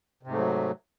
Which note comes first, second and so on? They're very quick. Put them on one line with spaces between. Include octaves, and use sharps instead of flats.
C3 G#2 A3 F#3